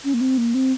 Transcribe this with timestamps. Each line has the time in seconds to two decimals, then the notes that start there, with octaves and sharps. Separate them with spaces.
0.04 C#4
0.14 A#3
0.21 C4
0.38 A#3
0.54 C4